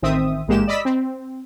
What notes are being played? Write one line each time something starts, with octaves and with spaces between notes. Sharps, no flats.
A1 D#3 C4 E5 D#6
A1 G#2 G#3 A#3 G4 E7
D5 D#5 B5 E6 B6
C4